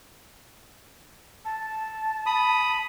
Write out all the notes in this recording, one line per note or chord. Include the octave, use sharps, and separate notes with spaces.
A5
B5 D#6